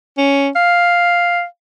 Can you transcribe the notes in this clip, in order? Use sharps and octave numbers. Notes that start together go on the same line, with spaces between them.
C#4
F5